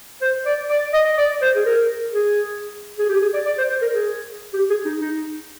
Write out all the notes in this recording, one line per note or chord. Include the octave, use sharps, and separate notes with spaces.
C5
D5
D5
D#5
D5
C5
G#4
A#4
G#4
G#4
G4
G#4
D5
D5
C5
C5
A#4
G#4
G4
G#4
D#4
D#4